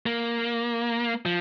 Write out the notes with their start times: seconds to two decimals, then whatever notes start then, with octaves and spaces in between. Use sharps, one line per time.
0.06 A#3
1.26 F3